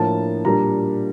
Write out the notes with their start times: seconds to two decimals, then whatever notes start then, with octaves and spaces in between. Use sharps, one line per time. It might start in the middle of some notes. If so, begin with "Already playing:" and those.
Already playing: A2 F3 A#3 D4 A5
0.45 A#2 G3 A#3 D4 A#5